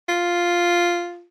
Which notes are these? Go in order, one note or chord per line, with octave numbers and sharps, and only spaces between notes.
F4